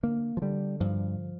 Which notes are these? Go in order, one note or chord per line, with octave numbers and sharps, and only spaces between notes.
D3 A#3
F3
D3 G3
G2 F3